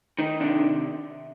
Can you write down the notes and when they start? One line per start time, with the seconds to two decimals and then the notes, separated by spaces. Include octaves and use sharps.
0.18 D#3 D#4
0.40 C3 D4